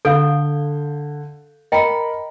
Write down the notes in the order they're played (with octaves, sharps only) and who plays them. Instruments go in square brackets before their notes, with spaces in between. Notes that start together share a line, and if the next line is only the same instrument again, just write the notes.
[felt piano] D3 G6 [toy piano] A4 F5
[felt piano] A#4 B5 [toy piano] D#5 G5 A#5